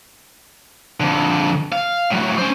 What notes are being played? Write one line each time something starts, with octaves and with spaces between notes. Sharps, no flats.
F2 D3
F5
A2 F#3
C#4 C5